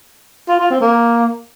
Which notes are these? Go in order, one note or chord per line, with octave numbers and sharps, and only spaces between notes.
F4
F4
C4
A#3